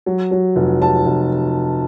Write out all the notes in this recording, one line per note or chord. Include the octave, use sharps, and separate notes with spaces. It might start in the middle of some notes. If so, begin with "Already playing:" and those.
F#3
F#3
F1
F#3 A5
F1